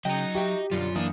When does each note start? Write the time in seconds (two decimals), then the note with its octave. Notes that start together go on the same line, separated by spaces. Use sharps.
0.05 C#3 F#3 D#5 G5 A#5
0.35 F#4 G4 E5 G5
0.71 F#2 B2 D3 G3 F4
0.96 E3 A#3 D4 D#6